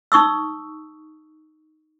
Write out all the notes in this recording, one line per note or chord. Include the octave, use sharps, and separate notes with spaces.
D#4 C#6 D#6 E6